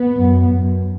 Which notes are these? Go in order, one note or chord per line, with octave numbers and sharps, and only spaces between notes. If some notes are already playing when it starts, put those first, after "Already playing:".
Already playing: B3
F#2
F#2